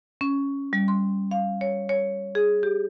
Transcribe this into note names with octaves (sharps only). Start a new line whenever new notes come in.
C#4
G3
C6
F5
C#5
C#5
G#4
G4